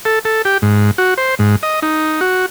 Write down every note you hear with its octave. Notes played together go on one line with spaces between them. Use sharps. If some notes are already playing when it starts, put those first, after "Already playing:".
A4
A4
G4
G#2
F#4
C5
G#2
D#5
D#4
F#4